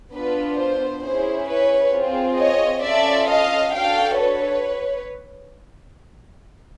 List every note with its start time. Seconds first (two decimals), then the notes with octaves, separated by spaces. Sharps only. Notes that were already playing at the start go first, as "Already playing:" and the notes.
0.13 B3 D4 F4 B4
0.58 C5
1.03 C#4 E4 G#4 C5
1.49 B4 C#5
1.93 C4 F4 G#4
2.38 C#5 D#5
2.84 C#4 F4 A4 D5 E5
3.28 D#5 F5
3.74 D4 F#4 A4 F5 G5
4.19 B4 C#5